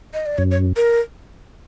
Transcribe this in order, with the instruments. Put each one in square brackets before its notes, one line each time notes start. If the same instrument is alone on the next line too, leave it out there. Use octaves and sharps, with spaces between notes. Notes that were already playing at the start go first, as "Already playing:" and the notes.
[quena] D#5
D5
[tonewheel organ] F#2 [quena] C#5
[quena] C#5
A#4